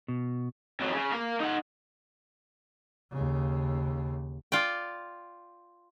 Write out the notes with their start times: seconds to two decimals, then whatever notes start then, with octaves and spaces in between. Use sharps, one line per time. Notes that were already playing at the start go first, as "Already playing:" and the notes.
0.08 B2
0.80 F2 F#3
0.92 C#3
1.12 A#4 F5
1.40 D#4 F#5
3.12 D#2 C#3
4.52 F4 D5 G5